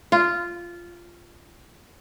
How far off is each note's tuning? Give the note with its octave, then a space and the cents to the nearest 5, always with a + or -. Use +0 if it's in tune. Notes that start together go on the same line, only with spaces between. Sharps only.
F4 -10